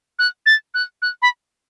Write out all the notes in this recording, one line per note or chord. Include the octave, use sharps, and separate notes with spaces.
F#6
A6
F#6
F#6
B5